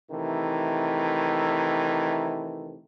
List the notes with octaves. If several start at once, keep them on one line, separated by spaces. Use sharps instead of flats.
C3 D#3 E3 A3